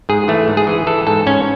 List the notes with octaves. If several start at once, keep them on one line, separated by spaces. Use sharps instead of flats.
G#2 G#4
E3 A3
G#2
G#4
E3
E3 A4
G#2 A4
G#2 C#4